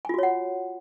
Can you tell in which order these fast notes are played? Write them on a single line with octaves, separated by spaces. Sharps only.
G#5 F4 F#4 C#5 F#5